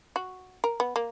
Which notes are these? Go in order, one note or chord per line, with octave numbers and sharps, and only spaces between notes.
F#4
A#4
B3
A#3